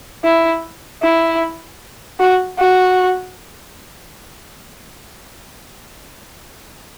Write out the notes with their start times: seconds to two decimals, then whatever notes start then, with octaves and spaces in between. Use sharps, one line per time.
0.24 E4
1.02 E4
2.20 F#4
2.58 F#4